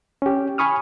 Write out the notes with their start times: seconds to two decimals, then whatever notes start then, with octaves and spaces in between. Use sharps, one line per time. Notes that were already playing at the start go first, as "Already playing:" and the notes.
0.22 C#4 G4
0.58 G#5 B5 C#6 D#6 F6